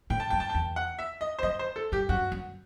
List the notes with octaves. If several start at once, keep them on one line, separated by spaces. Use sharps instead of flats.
A2 G5
A5
F#2 G5
A5
G5
E2
F#5
E5
D#5
C5
F#2 D#5
C5
A4
G2 G4
F#2 F#4
F#2